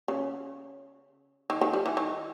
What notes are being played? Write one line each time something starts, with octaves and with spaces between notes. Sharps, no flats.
C#3
D#3
D#3
G3
E3
D#3